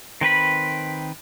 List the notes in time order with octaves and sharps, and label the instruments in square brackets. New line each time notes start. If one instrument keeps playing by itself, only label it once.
[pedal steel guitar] D#3 C4 B4 B5